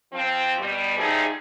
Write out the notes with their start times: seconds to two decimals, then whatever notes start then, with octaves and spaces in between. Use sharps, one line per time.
0.12 F3 C4
0.57 B2 G3
0.98 F3 G3 A3 D#4 G#4